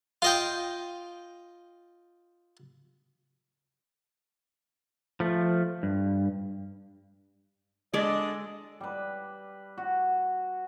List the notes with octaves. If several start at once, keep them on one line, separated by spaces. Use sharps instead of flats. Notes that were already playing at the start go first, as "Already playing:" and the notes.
F4 D#5 G5
F3 A3
G2
G#3 D4 A4 D5 D#5
G3 B4
F#4